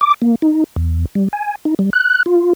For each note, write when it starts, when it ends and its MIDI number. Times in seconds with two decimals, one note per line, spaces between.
0.01 0.14 86
0.22 0.35 58
0.42 0.64 63
0.76 1.05 40
1.15 1.28 55
1.33 1.55 80
1.65 1.74 63
1.79 1.90 55
1.93 2.23 90
2.26 2.53 65